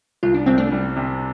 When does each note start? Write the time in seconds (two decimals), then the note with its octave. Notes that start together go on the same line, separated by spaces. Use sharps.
0.23 C2 F4
0.34 D4
0.46 C2 C4
0.58 A3 D4
0.72 G3
0.96 C3